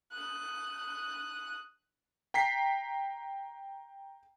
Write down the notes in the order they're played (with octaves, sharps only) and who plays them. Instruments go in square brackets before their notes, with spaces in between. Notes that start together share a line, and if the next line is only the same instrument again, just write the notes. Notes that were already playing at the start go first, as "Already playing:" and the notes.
[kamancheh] D#6 F#6
[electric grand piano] G5 A#5 B6 C7